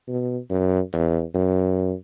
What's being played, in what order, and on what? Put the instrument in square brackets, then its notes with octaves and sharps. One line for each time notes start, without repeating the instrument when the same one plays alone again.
[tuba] B2
F#2
E2
F#2